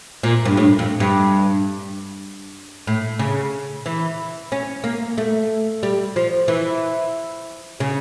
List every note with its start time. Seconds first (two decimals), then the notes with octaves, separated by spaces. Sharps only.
0.23 A#2
0.45 G2
0.57 A2
0.79 F2
1.00 G2
2.87 A2
3.19 C#3
3.86 E3
4.52 C#4
4.84 A#3
5.18 A3
5.83 G3
6.16 F3
6.48 E3
7.80 C#3